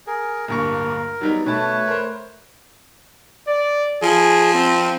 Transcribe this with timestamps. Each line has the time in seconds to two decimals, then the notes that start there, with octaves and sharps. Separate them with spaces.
0.07 G#4 A#4
0.48 D1 G2 A#3 A#4 C#6
1.21 F#3 G3 B3 D#4
1.46 B2 A3 B4 C#5 A5
1.88 A#4 C5
3.48 D5
4.03 F3 G#4
4.54 C4